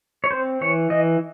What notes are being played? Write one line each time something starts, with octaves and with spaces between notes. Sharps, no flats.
C#5
C4 C5
E3 C#5
E3 D#5